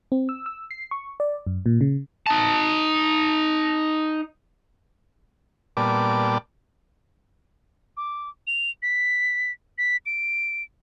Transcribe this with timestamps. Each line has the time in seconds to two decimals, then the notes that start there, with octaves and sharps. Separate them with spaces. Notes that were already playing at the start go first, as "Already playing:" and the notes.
0.12 C4
0.29 E6
0.46 E6
0.71 C7
0.91 C#6
1.20 D5
1.47 F#2
1.66 A#2
1.81 C#3
2.27 D#4 A5
5.77 A#2 G3 B3 D5 A5 D6
7.97 D6
8.47 F7
8.82 B6
9.78 B6
10.06 D7